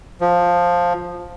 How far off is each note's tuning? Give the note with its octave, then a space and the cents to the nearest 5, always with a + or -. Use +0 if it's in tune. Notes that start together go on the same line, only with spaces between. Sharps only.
F3 +10